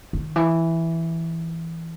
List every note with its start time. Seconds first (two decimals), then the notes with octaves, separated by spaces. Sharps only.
0.13 D#3
0.36 E3